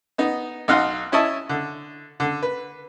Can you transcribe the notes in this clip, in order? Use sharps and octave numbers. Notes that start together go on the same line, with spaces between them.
B3 D#4
B1 D#4 F5 F#5 C6
C#4 E4 C#5 D#5 A5
D3
D3
B4